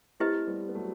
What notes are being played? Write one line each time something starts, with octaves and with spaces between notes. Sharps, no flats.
A3 C4 E4 G4 B4 D#5
G3 B3
B3
F#3 A3